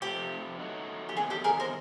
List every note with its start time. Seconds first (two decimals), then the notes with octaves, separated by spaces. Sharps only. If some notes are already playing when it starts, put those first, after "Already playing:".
0.02 F2 C3 F3 A3 C4 G4
0.59 F#3 A3 C4 D#4 F#4
1.09 G4
1.16 E2 C3 D#3 F#3 G#4
1.30 G4 A4
1.44 G#4 A#4
1.60 A#4 C5